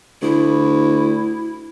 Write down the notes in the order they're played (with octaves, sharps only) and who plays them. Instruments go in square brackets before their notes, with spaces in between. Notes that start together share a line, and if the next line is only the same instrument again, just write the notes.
[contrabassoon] D2 [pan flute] E4